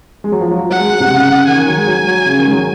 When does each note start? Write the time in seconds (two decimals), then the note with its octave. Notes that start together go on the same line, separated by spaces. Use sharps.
0.24 G#3
0.32 F#3
0.41 F3
0.51 F#3
0.70 F#3 F#5
0.80 G#3
1.00 C3
1.10 C#3
1.48 D#3 G#5
1.58 D#3
1.67 F#3
1.77 G#3
1.87 F#3
2.07 F#3
2.26 C#3
2.39 D#3
2.46 G#3
2.52 F#3